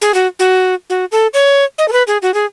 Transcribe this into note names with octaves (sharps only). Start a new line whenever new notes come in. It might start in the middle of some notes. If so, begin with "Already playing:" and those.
G#4
F#4
F#4
F#4
A4
C#5
D#5
A4
B4
G#4
F#4
G#4